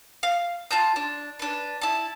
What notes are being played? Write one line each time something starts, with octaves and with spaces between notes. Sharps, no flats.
F5
F4 A5 G6
D4
D4 B4
E4 A5